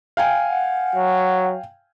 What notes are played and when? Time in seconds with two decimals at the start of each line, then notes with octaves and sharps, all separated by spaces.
0.17 F5 G5 G#5
0.49 F#5
0.96 F#3